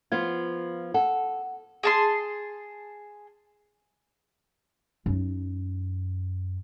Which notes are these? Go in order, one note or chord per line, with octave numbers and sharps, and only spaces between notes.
F3 B3 F4 G#6
A4 F#5
G#4 A5 C6
F#2 D#4